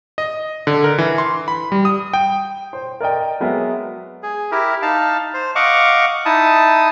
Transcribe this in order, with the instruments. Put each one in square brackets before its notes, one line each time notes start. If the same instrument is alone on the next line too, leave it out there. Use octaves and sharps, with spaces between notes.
[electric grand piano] D#5
D3
A#4
E3
C6
B5
G3
D#6
G5
[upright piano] C5
A#4 D5 D#5 G5
F#3 G#3 B3 A#4 E5
[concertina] G#4
E4 G4 A#4
D#4 F5 A5
C5
D#5 F5 F#5 C#6 D6
D#4 E4 A5 D#6